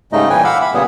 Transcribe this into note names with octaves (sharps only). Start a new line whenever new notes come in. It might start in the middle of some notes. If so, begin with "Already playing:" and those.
G#2 C#3 G3 A3 D#4 D#5
A#2 E3 B4 G5 G#5
F5 F#5 B5 D6 E6
E5 B5
A#2 C#3 G3 B3 G#4